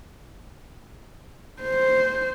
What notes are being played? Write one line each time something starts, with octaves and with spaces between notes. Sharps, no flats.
C5